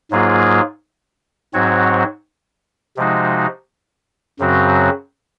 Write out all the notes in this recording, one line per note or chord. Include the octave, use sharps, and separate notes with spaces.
G#2 F#3 A#3 F4 G#4
G#2 F#3 C4 F#4 C#5
C3 F3 G#3 D#4 F#4
F#2 C#3 F#3 C4 F#4